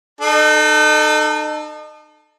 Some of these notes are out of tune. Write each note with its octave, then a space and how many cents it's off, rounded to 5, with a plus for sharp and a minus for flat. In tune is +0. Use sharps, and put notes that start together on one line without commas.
D#4 -35 A4 +0